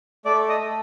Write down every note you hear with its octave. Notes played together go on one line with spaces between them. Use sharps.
A3 D5
D#5
A3